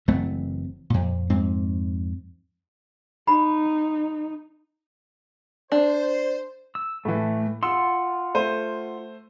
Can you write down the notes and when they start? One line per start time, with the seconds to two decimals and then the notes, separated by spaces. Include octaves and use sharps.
0.08 F#1 E3 A3 C4
0.90 F2 A#2
1.30 F2 G#2 C4
3.27 D#4 B5
5.72 D4 C5
6.75 E6
7.05 A2 E3 A3
7.63 F4 F#5 C6 E6
8.35 A3 C5 D#7